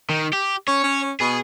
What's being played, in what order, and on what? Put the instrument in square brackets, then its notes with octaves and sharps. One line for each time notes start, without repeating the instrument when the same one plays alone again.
[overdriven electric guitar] D#3
G4
[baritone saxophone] C#4 [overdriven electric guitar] C#5
[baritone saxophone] C#4
[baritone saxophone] B2 [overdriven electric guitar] G#4